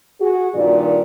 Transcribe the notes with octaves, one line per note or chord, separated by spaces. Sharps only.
F#4 G#4
G2 A#2 D#3 D5